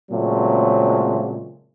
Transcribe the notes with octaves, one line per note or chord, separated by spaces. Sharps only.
A#2 C#3 F#3 G#3 A3 C4